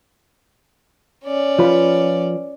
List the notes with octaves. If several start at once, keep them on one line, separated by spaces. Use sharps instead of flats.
C#4 D5
F3 F4 B4